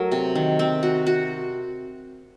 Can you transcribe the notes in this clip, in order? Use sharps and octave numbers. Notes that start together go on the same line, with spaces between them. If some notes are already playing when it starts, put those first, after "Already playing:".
Already playing: F#3 A3 A#4
C3
D#3
C4
F#4
F#4